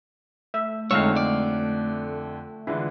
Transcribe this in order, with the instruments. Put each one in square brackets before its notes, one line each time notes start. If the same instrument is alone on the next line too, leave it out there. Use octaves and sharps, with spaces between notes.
[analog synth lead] A3 [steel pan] E5
[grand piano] F2 D3 [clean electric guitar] G#3 C#5 [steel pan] D#4 F5 E6
[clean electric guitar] D5
[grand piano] D3 E3 G#3 [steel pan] E4 [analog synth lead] F4